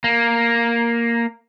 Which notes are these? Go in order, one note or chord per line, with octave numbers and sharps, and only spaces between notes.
A#3